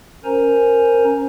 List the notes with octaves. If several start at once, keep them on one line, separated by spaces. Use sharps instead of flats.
C#4 A#4 C5 G#5 A#5